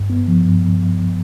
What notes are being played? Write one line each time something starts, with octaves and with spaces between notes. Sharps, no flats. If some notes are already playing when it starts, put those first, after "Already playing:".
Already playing: G2
B3
F3
G2
G2